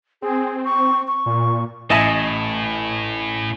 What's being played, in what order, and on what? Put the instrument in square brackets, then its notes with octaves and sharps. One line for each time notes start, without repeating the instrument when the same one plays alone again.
[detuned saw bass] C4 [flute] G#4
[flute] C#6
C#6
[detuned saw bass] A#2
[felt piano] A1 G#5 D#7 [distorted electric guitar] A2 [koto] D#5 E5 A5